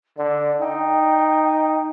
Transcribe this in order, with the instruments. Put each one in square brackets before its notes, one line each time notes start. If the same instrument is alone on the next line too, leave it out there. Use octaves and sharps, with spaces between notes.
[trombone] D3 [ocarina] D5
[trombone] D#4 [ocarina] G5